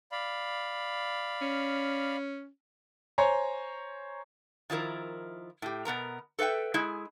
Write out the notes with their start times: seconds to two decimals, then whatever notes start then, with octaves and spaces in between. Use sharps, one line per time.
0.12 D5 F5 B5
1.42 C#4
3.18 C5 C#5 G#5 A#5
4.70 D#3 F3 E4 A#4
5.62 A2 G4
5.85 B2 B3 A#4 A#5
6.39 A4 B4 E5 F#5 G5
6.74 G#3 E4 G#4